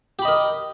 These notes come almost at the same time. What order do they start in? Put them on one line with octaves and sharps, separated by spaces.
G4 B5 D#5 A#4